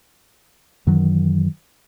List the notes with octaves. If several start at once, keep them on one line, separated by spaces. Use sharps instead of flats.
F#2 D#3 E3 F#3